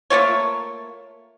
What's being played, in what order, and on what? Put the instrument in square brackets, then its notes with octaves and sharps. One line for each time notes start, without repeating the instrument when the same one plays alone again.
[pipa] A3 A#3 F4 C#5